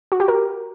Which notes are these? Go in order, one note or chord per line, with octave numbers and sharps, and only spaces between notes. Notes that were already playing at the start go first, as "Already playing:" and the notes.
F#4
G4
A#4